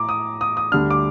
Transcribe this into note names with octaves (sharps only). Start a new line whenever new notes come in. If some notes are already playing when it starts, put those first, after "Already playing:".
Already playing: A2 A#5 D6
D#6
D#6
D#6
D2 D3 G3 D4 F6
D6